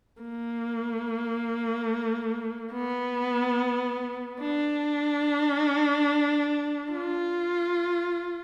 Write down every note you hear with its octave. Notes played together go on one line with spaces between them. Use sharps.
A#3
B3
D4
F4